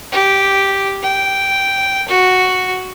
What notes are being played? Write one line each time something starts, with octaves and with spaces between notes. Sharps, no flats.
G4
G5
F#4